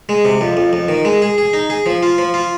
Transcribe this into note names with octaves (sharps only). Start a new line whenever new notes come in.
G#3
C3
F2
F2
F2
D#3
G#3
G#4
G#4
D#4
G#4
F3
F4
F3
F4